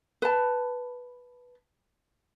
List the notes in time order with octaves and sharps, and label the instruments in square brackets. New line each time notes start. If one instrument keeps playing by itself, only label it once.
[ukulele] B4 A5